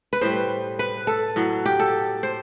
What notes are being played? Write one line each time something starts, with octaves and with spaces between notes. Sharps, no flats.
B4
A2 G3 C5
B4
A4
A2 F#3
G4
A4
C5